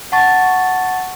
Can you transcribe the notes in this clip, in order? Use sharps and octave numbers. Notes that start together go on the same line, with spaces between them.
F#5 A5 C#6 A6